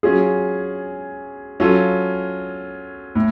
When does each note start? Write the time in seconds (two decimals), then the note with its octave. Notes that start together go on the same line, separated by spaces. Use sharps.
0.03 F#3 C#4 F4 G#4
1.60 F#3 C#4 F4 A4
3.15 A2